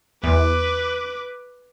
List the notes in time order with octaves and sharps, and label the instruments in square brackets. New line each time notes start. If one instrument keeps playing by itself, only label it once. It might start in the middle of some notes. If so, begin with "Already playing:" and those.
[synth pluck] E2 [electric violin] B4 D6